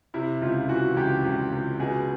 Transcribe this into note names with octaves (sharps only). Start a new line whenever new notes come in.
C3 E4
C#2 F4
E3 F#4
C#2 G4
C#2
C#2
B2 G#4